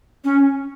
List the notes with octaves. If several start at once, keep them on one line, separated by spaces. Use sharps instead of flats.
C#4